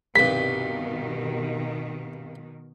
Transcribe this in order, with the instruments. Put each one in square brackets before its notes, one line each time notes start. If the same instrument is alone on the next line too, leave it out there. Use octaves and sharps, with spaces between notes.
[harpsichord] C2 G2 [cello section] B2 D#3 [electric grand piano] B6